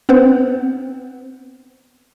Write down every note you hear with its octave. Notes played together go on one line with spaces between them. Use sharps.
B3 C4 B4 C5 F#5